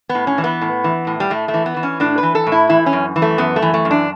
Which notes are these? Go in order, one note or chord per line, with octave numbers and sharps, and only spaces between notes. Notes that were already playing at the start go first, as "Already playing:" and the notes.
B3
A2
C#4
E3
B3
A2
E3
A2
G3
A2 A3
A3
E3
B3
E3
C#4
A2 D4
B4
E3
A4
A2
E4
E3 E4
C#4
F#2
E3
A3
F#2 B3
A3
E3
A3
F#2
D4